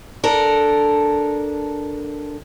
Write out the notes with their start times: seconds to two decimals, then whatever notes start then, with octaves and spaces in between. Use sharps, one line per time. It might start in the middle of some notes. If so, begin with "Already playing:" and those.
0.24 D4 A4 A#4